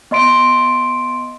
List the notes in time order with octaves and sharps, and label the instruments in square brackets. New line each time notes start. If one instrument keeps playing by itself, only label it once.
[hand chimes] B3 D#5 C6 D7